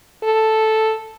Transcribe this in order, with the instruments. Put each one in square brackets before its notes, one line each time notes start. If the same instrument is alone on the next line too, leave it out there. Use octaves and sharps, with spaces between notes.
[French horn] A4